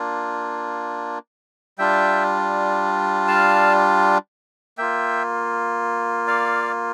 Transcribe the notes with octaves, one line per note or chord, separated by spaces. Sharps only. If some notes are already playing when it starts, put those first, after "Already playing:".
Already playing: A#3 D4 F4
G3 D4 F4 E5 G5
F5 A5
A#3 F4 E5 G5
D5 F5